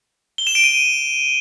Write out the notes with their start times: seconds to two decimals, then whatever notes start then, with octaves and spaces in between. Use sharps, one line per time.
0.38 G7
0.47 E7
0.55 D7
0.64 D#7